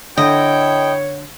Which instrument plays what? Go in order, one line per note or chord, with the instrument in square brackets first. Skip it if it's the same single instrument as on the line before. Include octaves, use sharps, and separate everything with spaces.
[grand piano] D3 [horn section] E4 A4 G5 [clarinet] C#5 [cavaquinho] D#5